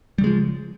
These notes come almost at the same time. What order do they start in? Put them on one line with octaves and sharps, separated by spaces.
G3 C#3 G#3 F3